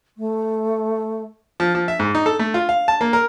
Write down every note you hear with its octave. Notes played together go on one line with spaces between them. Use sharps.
A3
F3
F3
E5
G#2
D#4
A4
A3
F4
F5
A5
A#3
A#4